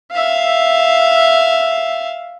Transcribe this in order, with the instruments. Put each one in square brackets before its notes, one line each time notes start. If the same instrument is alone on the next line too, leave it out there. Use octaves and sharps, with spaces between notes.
[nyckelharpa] E5 F5